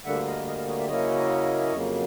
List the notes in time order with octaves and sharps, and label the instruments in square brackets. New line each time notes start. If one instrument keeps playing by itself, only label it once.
[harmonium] D2 D3 G3 A#3 E5 F#5
D#5 F5
D#5 F5
D#5 F5
C#5 D#5
D5 E5
C#3 F#3 A#3 C#4 E4 C#5 D#5
F2 C#3 F#3 A#3